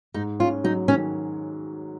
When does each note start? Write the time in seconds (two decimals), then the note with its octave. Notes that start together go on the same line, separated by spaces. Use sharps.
0.14 G#2 D#4
0.40 C#4 F4
0.64 F#3 D#4
0.88 D#3 C#4